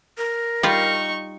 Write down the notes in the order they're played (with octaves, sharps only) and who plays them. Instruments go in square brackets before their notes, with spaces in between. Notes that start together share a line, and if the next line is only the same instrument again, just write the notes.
[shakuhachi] A#4
[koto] G3 F4 [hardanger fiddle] D#4 C#6